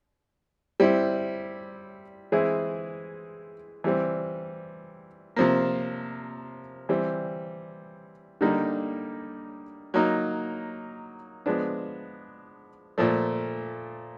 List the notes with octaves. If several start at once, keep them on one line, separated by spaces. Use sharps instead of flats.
G3 C4 E4
E3 G#3 C4 E4 G#4
E3 G3 C4
C3 F3 A#3
E3 G3 C4
D3 G3 A#3 D#4
F#3 A#3 D#4
F3 G#3 B3 D4
A#2 F3 A3